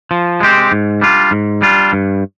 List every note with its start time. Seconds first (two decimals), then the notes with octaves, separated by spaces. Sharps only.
0.11 F3
0.40 G#3 C4 G4
0.72 G#2
1.01 G3 D4 F4
1.31 G#2
1.62 G3 D4 F4
1.93 G2